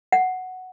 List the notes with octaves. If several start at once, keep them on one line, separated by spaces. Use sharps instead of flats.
F#5